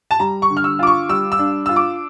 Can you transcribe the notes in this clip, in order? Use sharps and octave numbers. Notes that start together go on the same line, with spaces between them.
A5
G3 A#5
C#6
D3
F6
E6
F4 D6
C#6
G3 E6
E6
D4
F4 E6
D6